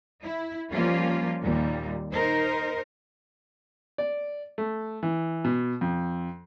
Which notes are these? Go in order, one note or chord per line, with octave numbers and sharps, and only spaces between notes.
E4
F3 G3 A#3 C#4 F4
D#2 A#2 G3
D#4 A#4 C5
D5
A3
E3
B2
F2